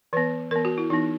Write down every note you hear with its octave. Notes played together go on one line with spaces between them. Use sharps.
E3 B3 B4
E3 B3 A#4
F#4
E4
E3 B3 D#4